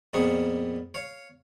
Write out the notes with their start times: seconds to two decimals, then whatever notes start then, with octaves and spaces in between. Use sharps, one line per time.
0.13 F2 A#2 G3 B3 G#4 C#6
0.94 C#5 F5